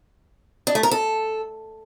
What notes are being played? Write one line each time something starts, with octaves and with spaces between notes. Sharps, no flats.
D4
A3
A#4
A4